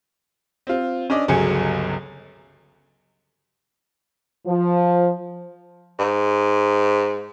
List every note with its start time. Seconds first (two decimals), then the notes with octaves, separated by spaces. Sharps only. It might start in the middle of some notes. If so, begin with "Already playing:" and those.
0.67 C4 F4
1.10 C#4 D4 D5 D#5
1.28 G1 C#2 F#3 G#4 G#5 C#7
4.47 F3
5.99 G#2